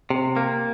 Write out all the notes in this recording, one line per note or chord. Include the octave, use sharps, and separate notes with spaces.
C3
A#3